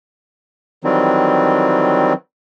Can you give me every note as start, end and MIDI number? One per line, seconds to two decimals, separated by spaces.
0.84 2.13 51
0.84 2.13 52
0.84 2.13 54
0.84 2.13 55
0.84 2.13 60